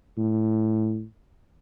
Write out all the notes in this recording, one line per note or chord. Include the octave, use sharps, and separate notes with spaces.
A2